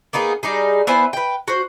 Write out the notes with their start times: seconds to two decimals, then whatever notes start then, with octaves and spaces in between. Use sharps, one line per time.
0.13 A#3 B3 D#4 G#4
0.43 G3 D#4 G#4
0.87 B3 E4 C5 G#5
1.13 B4 G5
1.48 F#4 C5